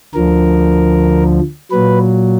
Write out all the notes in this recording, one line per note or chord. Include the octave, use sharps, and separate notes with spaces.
D2 D3 F3 A#4
A#2 F#3 B4